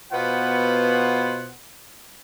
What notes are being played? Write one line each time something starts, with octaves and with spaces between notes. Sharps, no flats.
B2 B3 F4 B4 C5 F#5